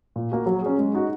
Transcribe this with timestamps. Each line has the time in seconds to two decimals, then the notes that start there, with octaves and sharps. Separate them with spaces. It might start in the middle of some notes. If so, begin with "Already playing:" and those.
0.16 A#2
0.32 A#3 F#4
0.46 F#3
0.62 C#4 G#4
0.79 G#3
0.94 D#4 F#4